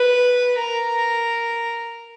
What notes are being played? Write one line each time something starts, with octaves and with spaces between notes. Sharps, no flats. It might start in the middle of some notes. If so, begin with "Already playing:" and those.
Already playing: B4
A#4